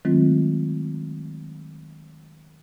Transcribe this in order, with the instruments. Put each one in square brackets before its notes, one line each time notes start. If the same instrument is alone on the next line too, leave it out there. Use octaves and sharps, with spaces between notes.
[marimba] D#3 F#3 G#3 A3 C4 F4